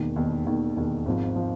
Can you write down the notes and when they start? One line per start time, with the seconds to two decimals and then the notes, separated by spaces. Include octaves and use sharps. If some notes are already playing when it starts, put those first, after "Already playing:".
Already playing: E1 D#2 D#3
0.16 E1 D#2 D#3
0.45 E1 D#2 D#3
0.76 E1 D#2 D#3
1.06 G#1 G#2 F3
1.36 F3